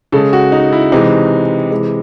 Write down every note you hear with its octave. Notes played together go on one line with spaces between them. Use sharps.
C#3 G#3 A4
F#4
D#4
E4
C3 E3 G#3 D#4
C3 E3 G#3